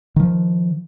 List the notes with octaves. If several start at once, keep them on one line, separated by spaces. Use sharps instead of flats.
D#3 F3